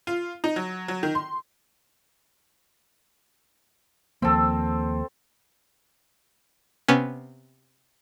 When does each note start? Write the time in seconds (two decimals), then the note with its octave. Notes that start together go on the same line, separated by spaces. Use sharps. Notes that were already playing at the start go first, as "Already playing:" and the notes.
0.07 F4
0.44 D#4
0.56 F#3
0.88 F#3
1.03 D#3
1.15 C6
4.22 D#2 F3 A#3 C4 A4
6.88 C3 B3 C#4